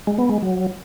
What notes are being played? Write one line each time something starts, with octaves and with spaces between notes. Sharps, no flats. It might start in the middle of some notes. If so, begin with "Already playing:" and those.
G#3
B3
G#3
F#3